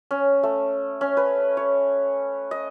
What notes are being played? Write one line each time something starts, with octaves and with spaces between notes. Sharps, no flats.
C#4
A3
C#4
B4
C#5
D#5